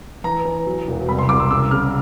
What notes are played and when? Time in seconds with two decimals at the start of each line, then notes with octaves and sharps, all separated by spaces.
0.24 E3 A#5
0.45 E3
0.66 F#3
0.87 E1
1.08 C2 B5
1.19 C6
1.29 C2 D6
1.40 E6
1.50 C#3 E6
1.71 C#3 F6